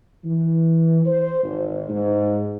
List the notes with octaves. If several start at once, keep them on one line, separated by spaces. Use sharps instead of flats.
E3
C5
G#1
G#2